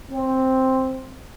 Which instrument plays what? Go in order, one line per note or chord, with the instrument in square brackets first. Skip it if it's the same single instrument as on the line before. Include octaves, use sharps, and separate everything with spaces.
[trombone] C4